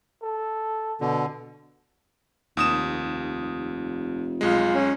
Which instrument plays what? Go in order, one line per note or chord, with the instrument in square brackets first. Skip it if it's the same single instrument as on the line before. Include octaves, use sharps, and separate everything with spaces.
[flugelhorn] A4
[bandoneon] B2 D3
[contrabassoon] F1 [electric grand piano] D#2 D#6 E7
[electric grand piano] B1 G#3 [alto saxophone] F4
[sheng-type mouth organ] C#4